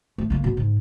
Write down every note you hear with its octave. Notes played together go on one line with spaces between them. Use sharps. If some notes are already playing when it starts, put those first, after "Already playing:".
A3
D3 A#3
C#2 B2
G#2